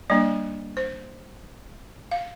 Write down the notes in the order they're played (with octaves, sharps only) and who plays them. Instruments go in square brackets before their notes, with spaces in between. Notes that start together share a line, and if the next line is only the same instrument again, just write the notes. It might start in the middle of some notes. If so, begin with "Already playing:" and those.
[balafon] G3 A#3 D4 D5
C5
F5